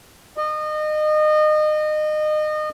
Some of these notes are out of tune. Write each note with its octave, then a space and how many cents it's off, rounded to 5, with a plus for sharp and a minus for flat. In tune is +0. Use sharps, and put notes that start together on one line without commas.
D#5 -30